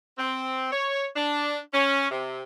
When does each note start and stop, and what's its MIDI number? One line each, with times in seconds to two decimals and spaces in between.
0.18 0.72 60
0.72 1.06 73
1.16 1.57 62
1.73 2.06 61
2.11 2.42 48